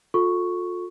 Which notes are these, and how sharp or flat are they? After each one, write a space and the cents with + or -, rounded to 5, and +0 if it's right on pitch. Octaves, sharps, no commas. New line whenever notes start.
F4 +35 A4 +0 C#6 +0